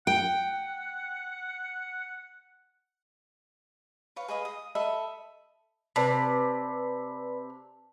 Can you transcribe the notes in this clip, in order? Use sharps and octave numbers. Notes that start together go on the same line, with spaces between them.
F#5 G5
B4 C#5 F5
G#4 B4 D#5 F5
D#6
A4 D#5 E5 B5
C3 B4 D5 A5 B5